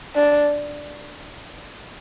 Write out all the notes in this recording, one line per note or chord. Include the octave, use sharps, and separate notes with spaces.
D4